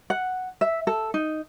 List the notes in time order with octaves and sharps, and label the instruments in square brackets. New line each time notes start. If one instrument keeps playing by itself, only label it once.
[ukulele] F#5
E5
A4
D#4